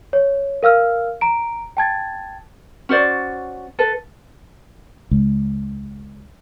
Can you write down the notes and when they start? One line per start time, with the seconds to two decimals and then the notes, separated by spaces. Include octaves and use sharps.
0.13 C#5
0.63 A#4 F5 E6 F6
1.21 A#5 D7
1.77 G5 A5 G#6 A6
2.89 C#4 F#4 C5 D5
3.79 A4 B4
5.11 C#2